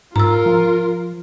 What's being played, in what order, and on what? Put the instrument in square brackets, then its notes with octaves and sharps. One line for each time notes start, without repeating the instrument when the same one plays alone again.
[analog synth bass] G#2 [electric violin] F4 A#4 [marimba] A#5 E6
[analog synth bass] F3